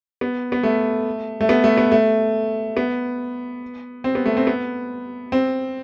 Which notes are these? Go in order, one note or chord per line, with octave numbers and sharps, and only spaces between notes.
B3
B3
A3
A3
B3
A3
B3
A3
B3
C4
B3
A3
C4
B3
C4